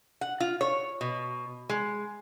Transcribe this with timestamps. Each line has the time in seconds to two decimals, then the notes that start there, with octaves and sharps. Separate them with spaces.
0.21 F#5
0.40 F4
0.61 C#5
1.01 B2
1.70 G#3